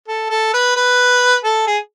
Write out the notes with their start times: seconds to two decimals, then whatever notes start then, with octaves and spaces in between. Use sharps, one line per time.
0.08 A4
0.30 A4
0.54 B4
0.76 B4
1.43 A4
1.67 G#4